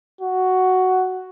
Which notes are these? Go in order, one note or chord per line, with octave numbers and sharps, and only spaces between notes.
F#4